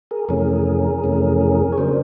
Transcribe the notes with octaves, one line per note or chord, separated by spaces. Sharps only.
G#4 A#4
F2 C3 E3 A3 C#4 G#4 A#4
F2 C3 E3 A3 C#4
C#5
C#3 F#3 A#3 D4 A#4 C5